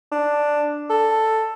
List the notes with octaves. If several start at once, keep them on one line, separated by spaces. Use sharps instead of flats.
D4
A4